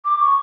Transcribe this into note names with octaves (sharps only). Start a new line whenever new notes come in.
D6
C#6